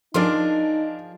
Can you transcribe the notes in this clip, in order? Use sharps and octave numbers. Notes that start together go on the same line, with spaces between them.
F3 D4 D#4 G#4 A#4 C6